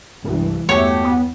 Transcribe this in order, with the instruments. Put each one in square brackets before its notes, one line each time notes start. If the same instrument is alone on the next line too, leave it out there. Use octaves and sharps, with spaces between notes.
[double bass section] C2 E3 G#3 [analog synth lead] G2
[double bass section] E2 G2 [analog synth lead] A3 [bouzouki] F#4 G4 [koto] C#5
[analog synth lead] B3